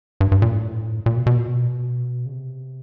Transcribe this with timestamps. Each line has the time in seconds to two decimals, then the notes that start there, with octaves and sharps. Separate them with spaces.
0.20 G2
0.32 G2
0.42 A#2
0.53 A2
1.06 A#2
1.16 B2
1.26 B2
1.37 A#2
1.48 B2
2.26 C#3
2.32 C3